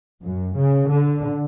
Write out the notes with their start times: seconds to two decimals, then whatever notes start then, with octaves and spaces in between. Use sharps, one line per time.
0.21 F#2
0.55 C#3
0.89 D3